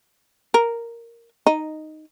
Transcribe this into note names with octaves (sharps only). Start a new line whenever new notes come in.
A#4
D#4